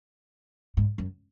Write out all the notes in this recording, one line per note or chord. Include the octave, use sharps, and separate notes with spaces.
G#2
F#2